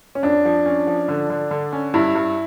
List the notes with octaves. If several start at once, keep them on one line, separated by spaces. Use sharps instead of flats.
C#4
F2 D4
F3
C#4
F3
D3
D3
D3
C#4
G2 E4
G2